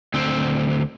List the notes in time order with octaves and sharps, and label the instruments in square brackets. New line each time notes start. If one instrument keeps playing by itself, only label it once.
[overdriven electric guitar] D2 C4